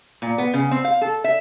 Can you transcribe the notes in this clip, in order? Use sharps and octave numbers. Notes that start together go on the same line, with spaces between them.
A#2
B3
C#3
C4
F5
A4
E5